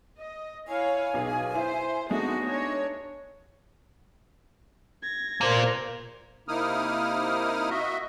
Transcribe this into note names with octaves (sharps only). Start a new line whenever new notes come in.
D#5
E4 C#5 F5 G#5
B1 B2 G#4 F5
E4 C5
G#3 A3 B3 D4 D#4 F#4 G#4
D4 C#5
G#6 A#6
A#2 A#3 A#4 C5
C3 A#3 D#4 E4 D#6 F6
F#4 D#5 E5